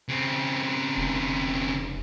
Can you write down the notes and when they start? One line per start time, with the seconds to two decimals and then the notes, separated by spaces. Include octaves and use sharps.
0.09 C#3 C4
0.97 F1